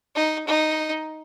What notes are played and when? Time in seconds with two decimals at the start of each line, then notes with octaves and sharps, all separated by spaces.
0.15 D#4
0.47 D#4